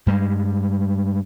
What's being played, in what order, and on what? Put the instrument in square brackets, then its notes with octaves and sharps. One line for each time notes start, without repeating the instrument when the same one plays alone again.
[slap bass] G2 G3 G#3